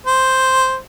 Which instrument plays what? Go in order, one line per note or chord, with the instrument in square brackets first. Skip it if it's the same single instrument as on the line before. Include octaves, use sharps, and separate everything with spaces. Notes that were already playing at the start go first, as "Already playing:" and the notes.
[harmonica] C5